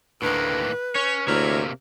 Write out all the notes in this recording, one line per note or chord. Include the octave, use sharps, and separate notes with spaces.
D2 A2 D#3 A#3 B4
C#4 C#5
D2 C3 A#3 E4 A#4 C#5